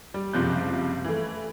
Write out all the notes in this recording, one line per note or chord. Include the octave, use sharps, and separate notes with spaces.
G3
F#1 C3 F3 G3 F#6 G6
E3 A3